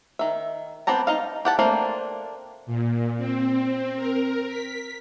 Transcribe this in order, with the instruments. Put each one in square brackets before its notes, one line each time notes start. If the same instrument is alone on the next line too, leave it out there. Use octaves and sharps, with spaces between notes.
[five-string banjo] D#3 E5
B3 C4 G4 A5 A#5
D#4 D#5 F5
G4 F#5 A5
A3 A#3 C4 D4
[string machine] A#2
C4
A#4
B6